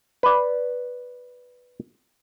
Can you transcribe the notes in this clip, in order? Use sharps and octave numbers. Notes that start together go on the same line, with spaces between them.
B4 D5